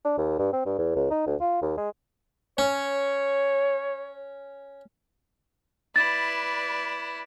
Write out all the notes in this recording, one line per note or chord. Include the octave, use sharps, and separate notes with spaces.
D4
D#2
G2
C4
G2
E2
C#2
D#4
D2
F4
D#2
G#3
C#4 C#5
E4 B4 D5 A6